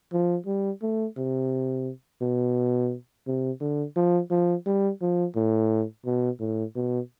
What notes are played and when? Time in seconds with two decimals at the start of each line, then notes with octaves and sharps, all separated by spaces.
0.13 F3
0.46 G3
0.82 A3
1.17 C3
2.22 B2
3.27 C3
3.61 D3
3.96 F3
4.30 F3
4.66 G3
5.01 F3
5.36 A2
6.06 B2
6.40 A2
6.76 B2